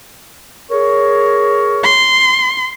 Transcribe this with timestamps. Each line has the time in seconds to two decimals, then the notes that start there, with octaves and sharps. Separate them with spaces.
0.70 G#4 A#4 C#5
1.83 C6